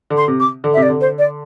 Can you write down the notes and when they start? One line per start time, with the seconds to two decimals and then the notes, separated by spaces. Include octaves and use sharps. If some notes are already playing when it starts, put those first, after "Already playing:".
0.10 D3
0.17 C6
0.28 C3
0.40 D6
0.64 D3
0.74 C3 E5
0.82 D5
0.88 D3
1.00 C5
1.18 D5